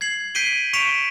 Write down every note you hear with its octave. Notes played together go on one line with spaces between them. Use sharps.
G#6 C7 F#7
G6 B6 C7 D7 D#7 G7
C#6 B6 C#7 D7 E7 F7